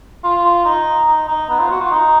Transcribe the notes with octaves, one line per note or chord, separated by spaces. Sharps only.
F4
D#4
D#4
D#4
B3
F4
F#4
F4
D#4